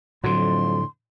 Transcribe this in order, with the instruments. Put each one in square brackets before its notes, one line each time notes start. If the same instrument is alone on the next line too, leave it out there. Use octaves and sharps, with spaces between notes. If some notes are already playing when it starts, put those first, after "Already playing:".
[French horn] F2 [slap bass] A2 D3 [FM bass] F#3 [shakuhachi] C6